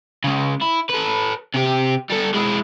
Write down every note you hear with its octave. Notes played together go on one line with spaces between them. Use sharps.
C#3 G#3
E4
A4 B4
C3 G4
G3 A4
G#3 E4